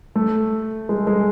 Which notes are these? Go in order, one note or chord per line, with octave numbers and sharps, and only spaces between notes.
A3
G#3
G#3